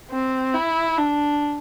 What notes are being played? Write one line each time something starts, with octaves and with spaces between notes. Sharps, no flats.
C4
E4
D4